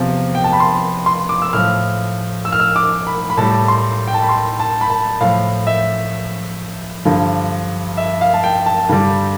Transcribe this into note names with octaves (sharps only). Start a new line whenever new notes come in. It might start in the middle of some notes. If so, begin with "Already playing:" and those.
Already playing: E2 C3 F3
G5
A5
B5
C6
C6
D6
E6
A2 F3 F6
E6
F6
E6
D6
B5
B5
A2 G3 A5
C6
G5
A5
B5
C6
A5
B5
A5
A2 F3 F5
E5
G2 D3 F3
E5
F5
A5
G5
A5
G2 D3 G3